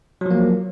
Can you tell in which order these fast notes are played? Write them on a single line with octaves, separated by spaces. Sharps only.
F#3 F3 A#3